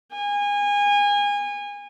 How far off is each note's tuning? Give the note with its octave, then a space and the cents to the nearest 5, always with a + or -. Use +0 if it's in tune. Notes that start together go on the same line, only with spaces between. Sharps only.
G#5 -25